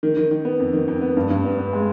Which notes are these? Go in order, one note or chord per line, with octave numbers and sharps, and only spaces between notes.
D#3
D#3
D#3
B3
F2
D#3
F2
B3
G2
G2
B3
B3
G#3